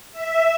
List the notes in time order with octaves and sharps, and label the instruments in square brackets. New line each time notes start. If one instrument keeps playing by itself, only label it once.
[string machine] E5